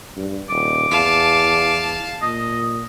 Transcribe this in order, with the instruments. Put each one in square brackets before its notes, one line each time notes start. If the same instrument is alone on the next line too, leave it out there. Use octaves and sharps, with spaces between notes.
[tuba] G2
[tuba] D#1 [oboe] D6
[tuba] E2 [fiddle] F5 A5
[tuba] A#2 [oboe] D#5